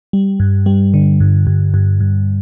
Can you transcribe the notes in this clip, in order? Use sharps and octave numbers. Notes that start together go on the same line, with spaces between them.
G3
G2
G3
D3
G2
G2
G2
G2